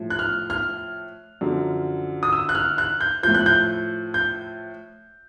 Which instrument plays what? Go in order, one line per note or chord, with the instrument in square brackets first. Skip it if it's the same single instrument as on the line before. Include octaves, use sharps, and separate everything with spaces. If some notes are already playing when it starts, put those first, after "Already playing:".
Already playing: [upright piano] A2 F3
F#6
F6
F6
F#2 D3 F3
D#6
E6
F#6
F6
F#6
G6
A2 F3 G6
F#6
G6
G6